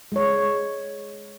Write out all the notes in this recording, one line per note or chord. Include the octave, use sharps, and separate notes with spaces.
G#3 C#5